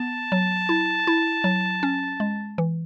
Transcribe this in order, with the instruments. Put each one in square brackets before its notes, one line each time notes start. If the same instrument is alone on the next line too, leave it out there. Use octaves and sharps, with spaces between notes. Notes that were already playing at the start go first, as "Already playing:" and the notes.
Already playing: [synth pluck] B3 [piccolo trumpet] A5
[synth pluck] F#3
E4
E4
F#3
C#4
G#3
E3